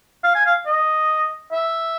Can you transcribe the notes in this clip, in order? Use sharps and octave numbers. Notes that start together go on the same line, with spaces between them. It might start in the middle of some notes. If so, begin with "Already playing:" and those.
F5
G#5
F5
D#5
E5